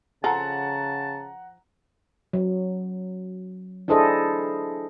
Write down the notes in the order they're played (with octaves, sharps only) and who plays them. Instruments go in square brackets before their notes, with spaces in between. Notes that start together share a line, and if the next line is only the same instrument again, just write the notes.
[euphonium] C#3 [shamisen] F3 G#4 A4 [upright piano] F#5 A#5 [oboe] A5
[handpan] F#3
D4 E4 G#4 A4 C5 D#5